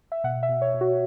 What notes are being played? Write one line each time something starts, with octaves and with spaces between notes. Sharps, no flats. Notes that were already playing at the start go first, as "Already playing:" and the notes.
E5
B2 F#5
E5
B2
C#5
B2
F#4